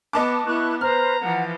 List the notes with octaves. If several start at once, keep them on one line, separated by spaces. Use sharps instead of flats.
B3 D#5 A5 D6
B3 E4 C#6 F#6
B4 C5 A#5 F6
E3 F3 F#5